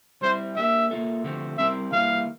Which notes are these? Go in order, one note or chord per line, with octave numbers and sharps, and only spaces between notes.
G3 C4 E4 C5
A#3 D4 G4 E5
A#3 F4 A4 E5
D3 F3 A3 C4 G4
G3 C4 E4 G4 A#4 E5
E3 G3 A#3 E4 F5